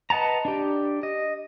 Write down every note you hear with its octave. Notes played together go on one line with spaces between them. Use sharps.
B4 D#5 F#5 A5 A#5
D4 G4
D#5